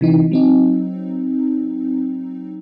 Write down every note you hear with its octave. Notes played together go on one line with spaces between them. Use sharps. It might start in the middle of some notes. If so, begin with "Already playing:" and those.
C3 E3 D#4
F#3 C4 D#4